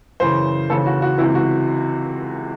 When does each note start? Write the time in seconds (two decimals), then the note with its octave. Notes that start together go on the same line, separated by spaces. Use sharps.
0.20 F#2 C#3 E3 C5
0.70 D#2 C#3 E3 A4
0.86 F#4
1.02 F#4
1.18 E3 E4
1.21 C#2 C3
1.35 F#4